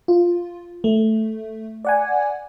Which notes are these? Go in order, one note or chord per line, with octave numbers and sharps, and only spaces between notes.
F4
A3
D5 F#5 G#5